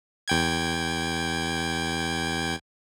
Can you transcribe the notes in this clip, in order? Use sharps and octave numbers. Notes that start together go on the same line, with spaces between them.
E2 G5 G#6